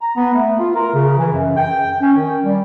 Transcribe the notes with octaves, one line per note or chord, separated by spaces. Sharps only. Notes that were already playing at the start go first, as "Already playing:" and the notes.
A#5
B3
A3
F4
A#4
C#3
E3
F#2
G5
C#4
D#3
G3